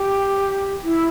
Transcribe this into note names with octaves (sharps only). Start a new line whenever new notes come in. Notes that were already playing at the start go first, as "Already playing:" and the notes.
Already playing: G4
E4